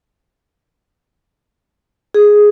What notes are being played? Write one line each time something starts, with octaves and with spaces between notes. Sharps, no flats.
G#4